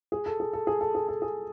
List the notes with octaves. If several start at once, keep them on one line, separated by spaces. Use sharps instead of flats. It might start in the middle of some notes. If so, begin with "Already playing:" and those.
G#4
A4
G#4
A4
G#4
A4
G#4
A4
G#4